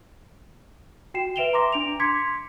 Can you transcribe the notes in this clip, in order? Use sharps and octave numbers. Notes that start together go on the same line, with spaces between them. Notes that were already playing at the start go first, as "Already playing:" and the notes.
F#4 G5 C7 E7
B4 E5 D7 E7 F7 G7
A#5 C6 D6 A#6
D4 D7 F7
C6 D6 G#6 B6 C#7